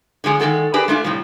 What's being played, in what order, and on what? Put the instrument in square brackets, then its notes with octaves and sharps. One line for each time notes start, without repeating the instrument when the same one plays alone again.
[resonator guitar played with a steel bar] D3 F3 G#3 G#4
D#3 G#3 C4 A4 F#5
D4 G4 G#4 A#4 B4
G#3 A3 D4 F4
A2 C3 F3 G3